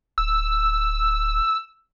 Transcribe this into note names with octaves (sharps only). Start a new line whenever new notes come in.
D1 E6